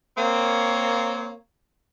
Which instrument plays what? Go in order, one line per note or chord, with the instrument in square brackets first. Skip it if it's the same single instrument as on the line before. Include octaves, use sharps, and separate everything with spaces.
[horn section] A#3 C4 C#5